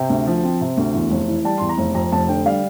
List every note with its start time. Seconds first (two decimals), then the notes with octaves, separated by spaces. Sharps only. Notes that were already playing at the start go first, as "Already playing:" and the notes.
Already playing: C3 G5
0.09 D2
0.27 F3
0.44 C4
0.61 C3
0.77 D2
0.94 E2
1.11 F1
1.28 E3
1.45 G3 A5
1.58 E2 C6
1.69 A#5
1.78 F1
1.94 F2 A#5
2.12 F1 A5
2.29 D3 G5
2.46 G3 F5